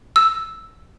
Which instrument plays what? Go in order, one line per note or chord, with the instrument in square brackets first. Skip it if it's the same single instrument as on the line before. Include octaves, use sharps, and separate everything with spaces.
[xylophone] E6